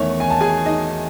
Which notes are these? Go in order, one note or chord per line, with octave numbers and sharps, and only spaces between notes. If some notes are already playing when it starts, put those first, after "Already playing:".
Already playing: E2 D#3 A3 C#5
G#5
A5
G#4 G#5
D#4 D#5